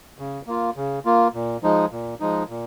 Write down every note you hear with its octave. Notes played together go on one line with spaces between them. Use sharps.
C#3
A#3 F4
C#3
A#3 F4
A#2
F3 G#3 D#4
A#2
F3 G#3 D#4
A#2